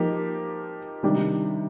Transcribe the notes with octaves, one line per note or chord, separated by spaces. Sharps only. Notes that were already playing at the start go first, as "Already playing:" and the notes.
Already playing: F3 A#3 D#4 G4
C3 D#3 G3 D4 G4